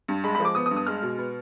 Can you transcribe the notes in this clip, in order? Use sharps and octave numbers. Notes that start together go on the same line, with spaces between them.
G2
G#3 B5
B5
F3 D6
B3 D#6
D#6
G2
D#6
G#3 F6
B2
B3